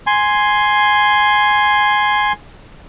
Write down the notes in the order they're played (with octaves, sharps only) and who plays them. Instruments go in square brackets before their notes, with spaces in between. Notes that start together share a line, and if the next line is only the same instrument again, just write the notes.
[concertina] G#5 C6